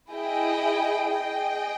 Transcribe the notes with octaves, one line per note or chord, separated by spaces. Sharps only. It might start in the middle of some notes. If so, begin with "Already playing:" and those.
E4 G#4 D#5 G5
G#4 D#5 G5